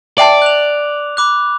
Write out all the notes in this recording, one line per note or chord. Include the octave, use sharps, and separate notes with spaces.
D5 E5 G5 A5
F#6 F7
B5 D6 F#6